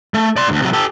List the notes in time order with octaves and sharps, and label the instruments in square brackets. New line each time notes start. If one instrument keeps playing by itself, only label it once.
[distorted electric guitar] A3
D5 C6
D2 G#2
C3 F#3
G4 A4